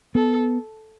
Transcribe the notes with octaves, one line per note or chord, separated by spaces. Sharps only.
B3 A4